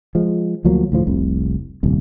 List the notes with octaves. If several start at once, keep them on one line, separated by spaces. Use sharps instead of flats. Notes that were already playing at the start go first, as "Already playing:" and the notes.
F3 G#3
D2 F3 F#3 A#3
D2 A2 F3
F1 C2
D#1 C2